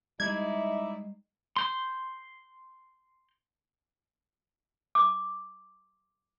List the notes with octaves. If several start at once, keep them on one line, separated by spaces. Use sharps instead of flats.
G3 G#3 D#4 E4 D5 E5 G#6
C6 G6
D6